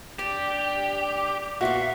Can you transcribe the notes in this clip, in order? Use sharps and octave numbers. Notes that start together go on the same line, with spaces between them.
D4 G4
A#2 B3 F#4 E5 F5